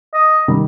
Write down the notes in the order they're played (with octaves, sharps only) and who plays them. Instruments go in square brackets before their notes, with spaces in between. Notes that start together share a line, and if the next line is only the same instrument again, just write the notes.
[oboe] D#5
[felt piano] D#3 G3